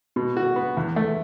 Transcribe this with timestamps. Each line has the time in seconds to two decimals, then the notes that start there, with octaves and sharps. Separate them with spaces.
0.16 B2
0.37 F#4
0.56 B3
0.77 E2
0.96 A3